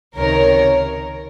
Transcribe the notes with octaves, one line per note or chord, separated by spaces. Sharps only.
C#2 C3 D#3 A#4 C#5